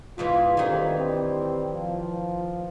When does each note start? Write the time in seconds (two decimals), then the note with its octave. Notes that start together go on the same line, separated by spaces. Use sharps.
0.18 E2 G#2 E3 F4
0.57 D2 C3 D#3 E3 G3
0.98 G3 C4
1.73 F3